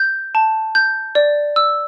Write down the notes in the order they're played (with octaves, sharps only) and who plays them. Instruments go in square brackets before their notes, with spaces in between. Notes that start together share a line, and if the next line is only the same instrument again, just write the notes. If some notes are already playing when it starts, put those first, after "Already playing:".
Already playing: [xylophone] G6
A5
G6
D5
E6